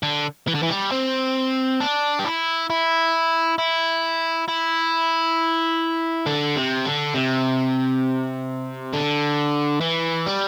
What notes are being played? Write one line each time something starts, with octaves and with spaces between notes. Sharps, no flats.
D3
E3
D3
E3
G3
C4
D4
G4
E4
E4
E4
E4
D3
C3
D3
C3
D3
E3
G3